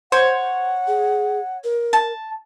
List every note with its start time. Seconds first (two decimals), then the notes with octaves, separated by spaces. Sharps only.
0.12 C5 C#5 F#5
0.88 G#4
1.64 A#4
1.93 A5